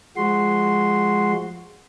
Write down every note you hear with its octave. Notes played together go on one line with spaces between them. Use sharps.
F3 G#3 F#4 C6